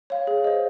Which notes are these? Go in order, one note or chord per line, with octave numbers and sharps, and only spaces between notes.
C#5 F5
G#4
C5 D#5